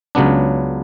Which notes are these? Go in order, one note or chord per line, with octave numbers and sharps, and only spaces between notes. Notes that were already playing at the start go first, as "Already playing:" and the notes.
C#2 C#3 F#3 B3 D4